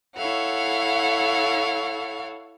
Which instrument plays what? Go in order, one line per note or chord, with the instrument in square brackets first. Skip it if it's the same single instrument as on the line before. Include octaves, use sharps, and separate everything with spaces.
[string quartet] E4 A4 C#5 F5 F#5